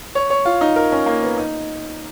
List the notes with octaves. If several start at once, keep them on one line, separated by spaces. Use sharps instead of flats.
C#5
C#5
F4
D#4
A#4
C#4
A#3
B3
D#4